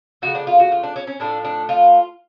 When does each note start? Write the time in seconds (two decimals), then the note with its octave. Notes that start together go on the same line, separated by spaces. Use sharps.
0.22 C#3 F3 A3 F#4
0.35 D4
0.47 F4
0.60 F#4
0.72 F4
0.83 D4
0.96 C#4
1.07 C#4
1.20 A2 F3 A3 D4
1.45 D4
1.69 F4